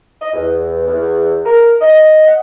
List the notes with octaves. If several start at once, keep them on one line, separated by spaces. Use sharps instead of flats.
D#5
E2
E2
A#4
D#5
F#5